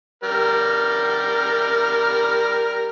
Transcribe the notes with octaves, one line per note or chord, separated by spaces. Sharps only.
G3 A#4